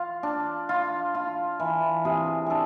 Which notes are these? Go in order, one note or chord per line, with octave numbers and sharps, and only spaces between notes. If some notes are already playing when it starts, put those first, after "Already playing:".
Already playing: F4
D4
F4
F4
E3
C3 G#4
D4 G#4 A4